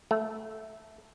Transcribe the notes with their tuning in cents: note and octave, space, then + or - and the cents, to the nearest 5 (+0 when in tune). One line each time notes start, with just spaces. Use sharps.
A3 -5